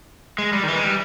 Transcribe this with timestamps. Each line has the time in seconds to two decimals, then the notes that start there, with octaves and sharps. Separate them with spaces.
0.38 G#3
0.53 G3
0.63 D#3
0.68 E3
0.76 G#3
0.84 G3